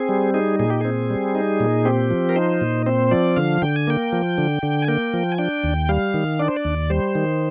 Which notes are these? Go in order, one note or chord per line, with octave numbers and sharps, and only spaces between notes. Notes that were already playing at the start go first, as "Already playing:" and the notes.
Already playing: C4 G#4
G3
D#4 G#4
A#2 G#4
G4
C4 G#4
G3
D#4
A#2
C4 G4
F3
A#4
D#4 C5
A#2
C4 C5
F3 D5
D3 F5
D3 G5
G#5
A#3 G5
F3
D3
D3
G#5
A#3 G5
F3
G#5
D4 G5
D#2
G3 F5
D#3
D4 D5
C5
D5
D#2
G3 C5
D#3